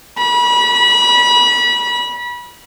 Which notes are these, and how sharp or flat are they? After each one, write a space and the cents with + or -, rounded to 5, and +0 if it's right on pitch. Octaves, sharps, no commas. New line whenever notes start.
B5 -30